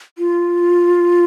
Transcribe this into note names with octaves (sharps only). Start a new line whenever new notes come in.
F4